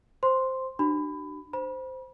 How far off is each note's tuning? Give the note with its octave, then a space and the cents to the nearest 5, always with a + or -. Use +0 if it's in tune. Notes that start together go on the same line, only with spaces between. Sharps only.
C5 +0 C6 +0
D4 +30 F#4 +40 B5 +25
C5 -10 B5 -30